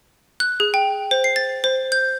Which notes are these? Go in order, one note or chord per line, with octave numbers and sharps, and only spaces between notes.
F#6
G#4
G5
C5
C7
A6
C5
G6